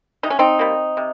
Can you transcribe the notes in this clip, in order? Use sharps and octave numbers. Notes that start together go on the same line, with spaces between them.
C3 D#4
C#4
C4 D#4
G3 A#3
C3